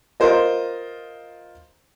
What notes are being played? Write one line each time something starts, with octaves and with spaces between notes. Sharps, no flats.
F4 A#4 C5 D#5